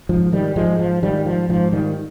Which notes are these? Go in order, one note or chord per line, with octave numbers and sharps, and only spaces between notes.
G#2 F3
D#3 G3
G#2 F3 G#3
F3
G#2 D#3 G3
F3
G#2 F3
D#3 G3